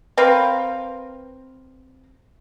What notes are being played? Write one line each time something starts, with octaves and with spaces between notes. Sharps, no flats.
C4 A#4 B4 F5